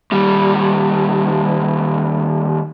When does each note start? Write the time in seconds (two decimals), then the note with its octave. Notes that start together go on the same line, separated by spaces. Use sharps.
0.12 D#2 G3